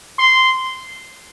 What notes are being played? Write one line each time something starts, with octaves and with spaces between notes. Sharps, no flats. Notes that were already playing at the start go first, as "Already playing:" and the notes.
C6